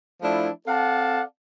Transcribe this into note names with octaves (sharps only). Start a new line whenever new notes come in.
F3 A3 D4 E4
C4 A4 D5 F5 F#5 A5